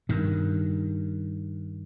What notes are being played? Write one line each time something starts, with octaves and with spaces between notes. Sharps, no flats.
G2 D#3